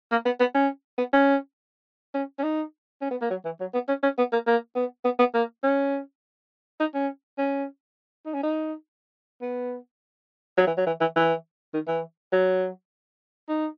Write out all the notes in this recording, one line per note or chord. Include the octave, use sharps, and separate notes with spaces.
A#3
B3
B3
C#4
B3
C#4
C#4
C#4
D#4
C#4
B3
A#3
F#3
E3
F#3
B3
C#4
C#4
B3
A#3
A#3
B3
B3
B3
A#3
C#4
D#4
C#4
C#4
D#4
C#4
D#4
B3
F#3
E3
F#3
E3
E3
E3
D#3
E3
F#3
D#4